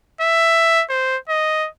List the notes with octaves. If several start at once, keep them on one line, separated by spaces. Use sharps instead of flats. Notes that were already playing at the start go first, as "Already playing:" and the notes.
E5
C5
D#5